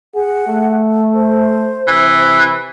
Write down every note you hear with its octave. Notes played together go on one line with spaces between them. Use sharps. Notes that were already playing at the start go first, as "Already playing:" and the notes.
G#4 F#5
A3
C5
C3 E3